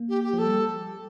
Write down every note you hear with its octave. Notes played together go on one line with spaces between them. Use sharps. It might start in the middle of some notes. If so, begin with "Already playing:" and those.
Already playing: A#3
G4
G4
F3
A4
G3